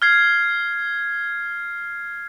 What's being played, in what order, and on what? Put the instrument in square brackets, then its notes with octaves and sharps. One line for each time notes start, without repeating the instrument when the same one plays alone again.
[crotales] F6 G#6 C7